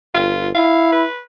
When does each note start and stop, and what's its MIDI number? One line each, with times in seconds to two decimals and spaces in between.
0.15 0.50 31
0.15 0.48 65
0.55 1.04 64
0.55 0.87 77
0.92 1.20 71